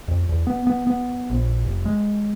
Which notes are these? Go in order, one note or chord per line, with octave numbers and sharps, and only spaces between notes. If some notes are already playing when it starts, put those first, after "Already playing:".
F2
E2
B3
B3
B3
A#1
F1
G#3